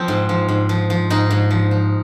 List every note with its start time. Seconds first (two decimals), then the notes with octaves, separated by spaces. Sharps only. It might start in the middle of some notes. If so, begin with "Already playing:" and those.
Already playing: F3 C4
0.08 G#2
0.29 F3
0.48 G#2
0.69 F3
0.90 F3
1.10 G#2 D#4
1.30 G#2
1.50 F3
1.71 F3